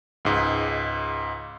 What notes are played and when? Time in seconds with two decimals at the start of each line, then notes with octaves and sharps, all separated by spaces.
0.25 C#2 G#2